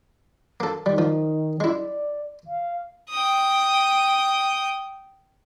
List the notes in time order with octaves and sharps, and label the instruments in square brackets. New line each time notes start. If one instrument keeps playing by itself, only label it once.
[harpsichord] A#3 A4
[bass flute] D#3 [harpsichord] G3
[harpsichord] F3
[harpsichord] G#3 E4 [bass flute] D5
[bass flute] F5
[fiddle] G5 D#6